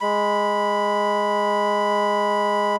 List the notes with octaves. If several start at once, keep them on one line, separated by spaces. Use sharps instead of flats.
G#3 B5